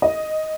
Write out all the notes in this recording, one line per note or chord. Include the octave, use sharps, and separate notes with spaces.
D#5